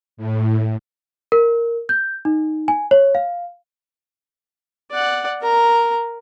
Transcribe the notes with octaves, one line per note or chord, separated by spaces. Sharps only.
A2
A#4
G6
D#4
G#5
C#5
F5
D5 F#5
A#4 A#5